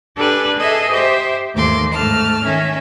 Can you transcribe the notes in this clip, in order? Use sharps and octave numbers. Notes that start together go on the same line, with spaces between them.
D4 G4 A4 B4 D5 G#5
G#4 A4 D#5 E5 G#5
G4 C5 E5
D#2 G#2 E3 A3 C6 D6
G#2 A3 A5 F6
D#3 C#4 E5